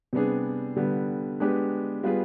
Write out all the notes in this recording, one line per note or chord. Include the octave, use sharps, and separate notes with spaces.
C3 G3 B3 D4 G#4
D3 G3 B3
G#3 B3 D4 G4 B4
G3 B3 F4 G#4 B4